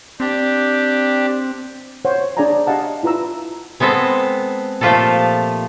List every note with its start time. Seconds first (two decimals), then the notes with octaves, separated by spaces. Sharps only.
0.20 C4 D4 G4
2.05 C5 C#5 F#5
2.37 D4 G#4 D5 F5 G#5 A#5
2.67 G4 D#5 F5 F#5 A5
3.03 E4 F4 B4 A#5 E6
3.80 G#3 B3 C4 A4
4.81 A#2 F3 A3 F4 G4 A4